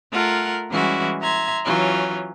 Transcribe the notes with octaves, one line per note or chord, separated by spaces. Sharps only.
A3 F4 A#4 F#5
E3 G3 G#3 C#4 E4 F#4
E5 A#5 C6 G#6
E3 F#3 C#4 F4